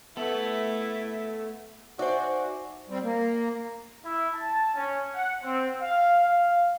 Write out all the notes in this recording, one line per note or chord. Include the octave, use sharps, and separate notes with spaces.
A3 B3 E4 A4 E5
D#4 F#4 C5 D5 E5 G#5
G3 C4
A#3
E4
A5
C#4
F#5
C4
F5
F5